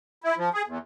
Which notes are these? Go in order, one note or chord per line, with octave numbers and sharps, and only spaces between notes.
E4
F3
G#4
E2